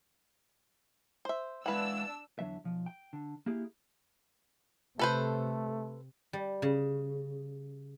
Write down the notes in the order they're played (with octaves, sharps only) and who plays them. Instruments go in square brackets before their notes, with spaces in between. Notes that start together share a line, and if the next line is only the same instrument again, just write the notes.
[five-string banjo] C5 E5
[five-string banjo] E3 B4 [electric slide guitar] G#3 F5 F#5 [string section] D4 E6
[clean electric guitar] E2 D3 F#3 E5
B1 F3
G5
D3
A#3 E4 G4 G#4
[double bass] C3 [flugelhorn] A3 [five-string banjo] A4 B4 C5
[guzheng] G3
C#3